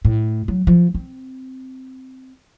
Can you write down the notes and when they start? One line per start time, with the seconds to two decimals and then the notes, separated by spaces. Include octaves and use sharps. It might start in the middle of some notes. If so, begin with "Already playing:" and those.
0.05 A2
0.48 F#3
0.67 F3
0.95 C4